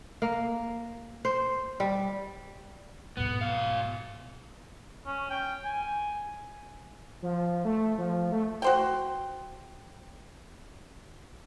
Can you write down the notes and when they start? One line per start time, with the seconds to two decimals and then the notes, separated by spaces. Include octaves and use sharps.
0.22 A#3
1.25 C5
1.80 G3
3.17 B1 G#2 B3
3.41 B2 F5
5.06 C#4
5.31 G5
5.64 G#5
7.22 F3
7.65 A3
7.98 F3
8.32 A3
8.62 F#4 C5 G5